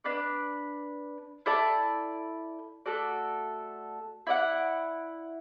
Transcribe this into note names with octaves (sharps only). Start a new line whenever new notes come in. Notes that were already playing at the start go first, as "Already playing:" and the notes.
D4 B4 D5
E4 A4 D5 A5
A3 F#4 A4 D5
E4 D5 F#5